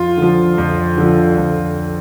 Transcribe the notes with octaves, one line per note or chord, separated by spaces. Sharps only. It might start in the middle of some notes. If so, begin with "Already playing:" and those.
Already playing: F2 F4
D3
F3
F2
D3 F3
F2